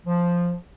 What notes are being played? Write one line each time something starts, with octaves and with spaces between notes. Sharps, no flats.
F3